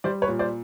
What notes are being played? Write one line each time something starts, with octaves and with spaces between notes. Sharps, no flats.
G3 C5 D5
B4 C#5
A#2
C5 D5